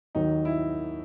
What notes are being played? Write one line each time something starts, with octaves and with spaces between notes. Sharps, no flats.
D#2 D#3 F#3 D#4
E4